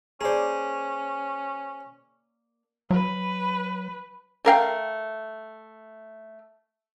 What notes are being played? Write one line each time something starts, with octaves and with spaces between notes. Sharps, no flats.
A#3 C#4 G#4 C5 D5
F#3 B4
A3 A#4 F5 G5